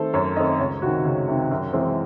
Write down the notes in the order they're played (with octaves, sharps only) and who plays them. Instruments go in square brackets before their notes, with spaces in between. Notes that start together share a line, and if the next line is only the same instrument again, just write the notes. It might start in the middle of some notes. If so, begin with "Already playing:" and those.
Already playing: [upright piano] D#3 A3 C4 A4 C5
F#2 C#5
D#3 A3 C4 D#5
C#2 C#5
C3 D#3 F#4
C#2
C3 D#3
F#2
E3 G#3 C4